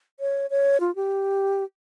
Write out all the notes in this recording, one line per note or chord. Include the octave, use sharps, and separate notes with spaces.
C#5
C#5
F4
G4